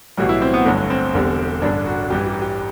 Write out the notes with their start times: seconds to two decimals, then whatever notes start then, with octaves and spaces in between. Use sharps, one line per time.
0.17 B1 A2 E3 G3 F#4
0.29 E4
0.42 C4
0.53 B3
0.65 G1 G2 D3 F#3 A3
0.90 C4
1.14 E1 E2 D3 G3
1.62 A1 G2 D3 D4
1.86 F#4
2.10 A1 G2 E3 G4
2.27 G4
2.42 G4